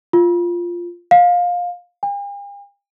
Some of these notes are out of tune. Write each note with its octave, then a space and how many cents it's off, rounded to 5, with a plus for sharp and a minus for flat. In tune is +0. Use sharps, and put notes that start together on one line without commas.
F4 -5
F5 +20
G5 +45